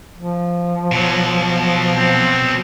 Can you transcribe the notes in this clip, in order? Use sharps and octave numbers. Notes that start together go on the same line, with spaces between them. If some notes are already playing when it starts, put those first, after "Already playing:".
F3
B2 F#3
C4